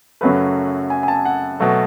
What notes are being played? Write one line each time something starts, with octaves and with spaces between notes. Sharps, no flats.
F#2 C#3 F#3 A3 B4
G#5
G#5
A5
F#5
B2 F#3 A3